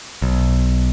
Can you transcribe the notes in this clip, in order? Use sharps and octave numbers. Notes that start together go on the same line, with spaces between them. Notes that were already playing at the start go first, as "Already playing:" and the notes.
B1